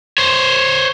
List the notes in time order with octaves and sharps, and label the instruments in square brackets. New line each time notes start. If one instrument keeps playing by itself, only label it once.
[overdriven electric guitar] C5 C#5